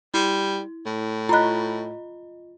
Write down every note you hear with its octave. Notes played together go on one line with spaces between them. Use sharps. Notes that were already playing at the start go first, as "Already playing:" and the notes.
G3 E4
A2
F4 D#5 A#5 B5 F#6